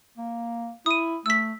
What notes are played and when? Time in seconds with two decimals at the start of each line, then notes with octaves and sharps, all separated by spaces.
0.17 A#3
0.86 E4 D#6 D#7
1.26 A3 E6 B6